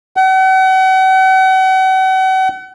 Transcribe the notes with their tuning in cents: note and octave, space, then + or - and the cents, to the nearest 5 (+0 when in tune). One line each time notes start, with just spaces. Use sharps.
F#5 +40